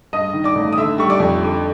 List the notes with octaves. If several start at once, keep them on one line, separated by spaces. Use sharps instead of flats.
G2 D#5 D#6
D#3
D5 D6
A1
D#6
D3 E5 E6
G3 C#6
D5 D6
F2
D3